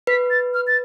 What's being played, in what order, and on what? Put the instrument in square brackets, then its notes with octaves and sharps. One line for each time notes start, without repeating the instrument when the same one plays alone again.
[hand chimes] B4 [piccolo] B6
[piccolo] A6
F6
A6